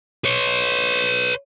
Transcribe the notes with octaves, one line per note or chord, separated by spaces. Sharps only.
B4 C#5